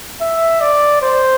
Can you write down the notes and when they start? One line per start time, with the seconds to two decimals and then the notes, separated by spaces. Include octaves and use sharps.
0.21 E5
0.61 D5
1.02 C5